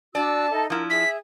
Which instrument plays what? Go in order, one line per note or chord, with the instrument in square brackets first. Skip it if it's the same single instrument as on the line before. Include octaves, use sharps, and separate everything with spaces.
[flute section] D4 F#4 E6 [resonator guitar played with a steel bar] D5 [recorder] A5
[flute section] D#4 A4 E5
[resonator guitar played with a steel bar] F3 E4 [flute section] A#4
[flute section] G#4 E5 [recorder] B6